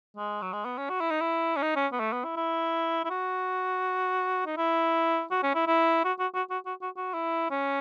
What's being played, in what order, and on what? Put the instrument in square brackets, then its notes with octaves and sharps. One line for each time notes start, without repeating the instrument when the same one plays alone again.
[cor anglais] G#3
F#3
G#3
B3
C#4
F#4
E4
D#4
E4
C#4
D#4
C#4
B3
A3
B3
E4
E4
E4
F#4
D#4
E4
F#4
C#4
E4
E4
F#4
F#4
F#4
F#4
F#4
F#4
F#4
E4
C#4